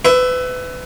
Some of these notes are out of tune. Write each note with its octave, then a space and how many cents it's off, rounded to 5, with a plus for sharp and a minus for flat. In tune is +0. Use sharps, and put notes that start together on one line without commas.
B4 +30 E5 +0